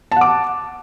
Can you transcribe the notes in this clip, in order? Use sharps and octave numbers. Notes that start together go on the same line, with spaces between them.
F#5 A5 D6